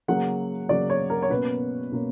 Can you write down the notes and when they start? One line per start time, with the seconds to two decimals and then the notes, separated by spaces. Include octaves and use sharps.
0.08 C#3 F#3 A#3 F#5
0.69 C#3 F#3 A#3 D5
0.90 C#5
1.10 A#4
1.22 C#5
1.30 B2 A#3 C#4 B4
1.92 B2 A#3 C#4